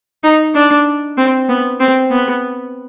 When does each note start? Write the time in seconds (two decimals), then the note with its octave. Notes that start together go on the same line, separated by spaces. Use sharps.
0.23 D#4
0.54 D4
1.17 C4
1.49 B3
1.80 C4
2.11 B3